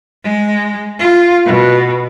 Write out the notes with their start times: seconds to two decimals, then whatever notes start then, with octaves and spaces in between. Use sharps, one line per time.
0.24 G#3
0.99 F4
1.46 B2